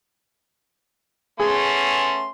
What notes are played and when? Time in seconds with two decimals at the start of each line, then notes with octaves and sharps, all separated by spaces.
1.40 A3 B3 C#4 G#4 C6